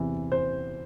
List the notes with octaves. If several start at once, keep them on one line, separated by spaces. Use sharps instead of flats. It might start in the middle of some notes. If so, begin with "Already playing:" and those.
Already playing: E2 C3 E3
C5